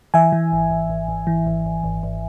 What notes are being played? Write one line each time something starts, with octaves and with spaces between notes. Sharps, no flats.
E3 E5 G#5
E3
G#1
G#1
G#1
G#1
E3
G#1
G#1
G#1
G#1